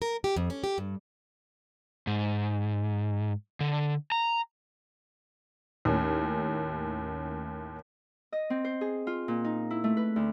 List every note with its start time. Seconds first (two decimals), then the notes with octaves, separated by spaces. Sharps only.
0.02 A#4
0.24 G4
0.36 F2
0.50 C#4
0.64 G4
0.78 G2
2.07 G#2
3.60 D3
4.12 A#5
5.85 D#2 A2 C#4
8.32 D#5
8.50 C4
8.64 C5
8.81 G#4
9.07 F4
9.28 A#2
9.44 D#4
9.70 E4
9.84 A3
9.97 B4
10.16 D2